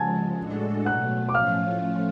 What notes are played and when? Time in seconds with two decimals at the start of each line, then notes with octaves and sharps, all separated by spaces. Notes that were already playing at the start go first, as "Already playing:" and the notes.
Already playing: C#3 F3 G#3 F#5 G#5 A5 G#6
0.38 A2 G#3 D4 F#4 A4
0.85 B2 F#3 A3 F#5 F#6
1.29 D6
1.34 A2 F3 A3 C#4 F4 F5 F6